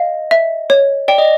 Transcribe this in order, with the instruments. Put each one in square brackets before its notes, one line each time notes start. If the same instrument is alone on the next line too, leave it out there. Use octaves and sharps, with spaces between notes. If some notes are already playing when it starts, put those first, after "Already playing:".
Already playing: [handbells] D#5 [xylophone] F5
[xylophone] E5
C#5
[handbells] D5 [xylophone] G5
[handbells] D#5